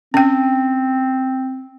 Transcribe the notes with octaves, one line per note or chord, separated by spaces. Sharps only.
C4 C#4 G5